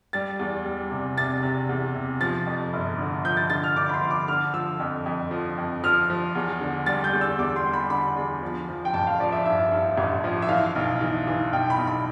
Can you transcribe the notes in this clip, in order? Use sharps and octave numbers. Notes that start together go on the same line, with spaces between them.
G3 A6
E2
G3
C3
C3 A6
C3
E2
C3
F3 A6
F2
G1
D3
F3 G6
A6
D3 A6
F6
D3 D6
B5
C6
F3
D6
D3 F6
F3 E6
F2
F2
F3
F2
F3 F6
F3
E2
D3
G3 A6
G6
E2
E6
E2 D6
C6
G3
B5
D3 B5
E2
F3
F3
G5
A1 A5
F5
F3 D5
E5
G2 E5
G2
A1
F3
E5
E3 F5
B1
E3
E3
B1 G5
B5
B1
B5